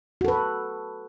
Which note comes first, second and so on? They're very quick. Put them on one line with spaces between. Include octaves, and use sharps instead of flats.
F#4 A4 B4